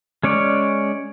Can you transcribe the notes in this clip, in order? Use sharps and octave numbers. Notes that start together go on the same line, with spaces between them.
G#3 C#4 C#5 D5